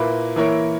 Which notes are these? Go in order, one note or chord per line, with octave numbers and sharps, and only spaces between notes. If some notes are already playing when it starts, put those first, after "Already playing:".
Already playing: A#2 A#3 E4 B4
E3 A#3 E4 A#4 C#5